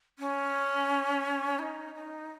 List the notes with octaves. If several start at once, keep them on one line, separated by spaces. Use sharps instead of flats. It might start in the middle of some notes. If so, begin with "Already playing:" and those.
C#4
E4
D#4
D#4